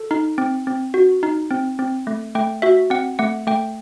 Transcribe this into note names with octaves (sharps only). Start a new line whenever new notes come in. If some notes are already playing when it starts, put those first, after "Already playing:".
Already playing: A4
D#4
C4
C4
F#4
D#4
C4
C4
A3
A3 G5
F#4 E5
C4 F#5
A3 F#5
A3 G5